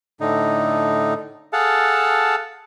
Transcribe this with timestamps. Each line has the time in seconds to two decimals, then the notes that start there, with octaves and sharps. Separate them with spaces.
0.21 A2 D3 D#4
1.53 G#4 A4 F5 F#5 A5